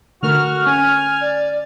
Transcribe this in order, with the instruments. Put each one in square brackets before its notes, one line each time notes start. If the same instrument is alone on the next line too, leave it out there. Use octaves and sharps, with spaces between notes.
[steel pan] D3 A3 A#4 [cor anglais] F#4 [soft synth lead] F6
[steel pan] C#4 [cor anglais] G#5
[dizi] D5